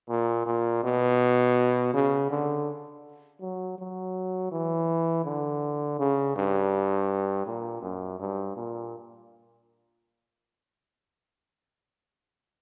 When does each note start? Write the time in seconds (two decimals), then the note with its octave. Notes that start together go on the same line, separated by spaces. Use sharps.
0.09 A#2
0.46 A#2
0.83 B2
1.94 C#3
2.30 D3
3.41 F#3
3.78 F#3
4.52 E3
5.25 D3
5.99 C#3
6.36 G2
7.46 A#2
7.82 F#2
8.20 G2
8.56 A#2